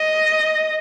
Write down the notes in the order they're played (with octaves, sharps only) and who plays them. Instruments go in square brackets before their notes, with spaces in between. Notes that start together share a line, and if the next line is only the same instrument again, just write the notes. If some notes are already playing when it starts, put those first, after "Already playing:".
Already playing: [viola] D#5